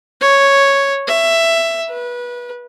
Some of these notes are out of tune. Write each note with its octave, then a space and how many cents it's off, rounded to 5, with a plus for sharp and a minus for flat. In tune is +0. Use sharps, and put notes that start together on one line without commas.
C#5 -5
E5 +10
B4 -25